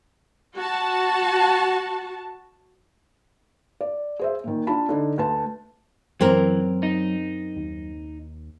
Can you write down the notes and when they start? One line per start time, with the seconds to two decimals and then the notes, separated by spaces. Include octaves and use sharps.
0.57 F#4 A5
3.81 D5
4.19 G#4 C5 E5
4.44 A#2 D#3
4.67 D4 F4 A5 B5
4.89 D3 D4 D#4
5.18 D2 B4 A5
6.21 F#2 E3 F#3 C4 A#4
6.83 D#4
7.56 D#2